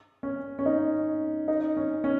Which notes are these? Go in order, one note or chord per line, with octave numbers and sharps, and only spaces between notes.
C#4
C#4
D#4
D#4
C#4
C#4